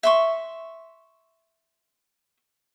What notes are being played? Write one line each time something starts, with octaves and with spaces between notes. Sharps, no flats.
E5 C6 C#6